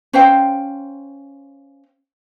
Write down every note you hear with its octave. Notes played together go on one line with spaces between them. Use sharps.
C#4 C5 F5 G5